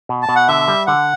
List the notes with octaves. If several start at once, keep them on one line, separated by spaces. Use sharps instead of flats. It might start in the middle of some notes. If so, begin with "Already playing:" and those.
B2
A5
B2
F#5
D3 E5
G3
D3 F#5